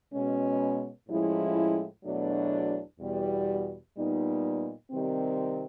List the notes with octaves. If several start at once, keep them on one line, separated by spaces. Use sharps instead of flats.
B2 G#3 C#4
A2 F3 G#3 C#4 E4
E2 B2 F#3 A3 D4
E2 B2 G3
A#2 G3 B3 D#4
C3 D#3 G3 C4